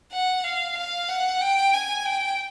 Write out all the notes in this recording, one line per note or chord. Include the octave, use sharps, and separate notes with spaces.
F#5
F5
F5
F#5
G5
G#5
G5